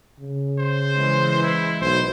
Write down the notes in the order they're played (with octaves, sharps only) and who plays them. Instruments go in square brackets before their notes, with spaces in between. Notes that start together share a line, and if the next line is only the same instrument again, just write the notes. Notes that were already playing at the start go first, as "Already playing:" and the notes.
[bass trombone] C#3
[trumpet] C5
[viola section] E3 G#3
[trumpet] E4
[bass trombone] B1 [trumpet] C5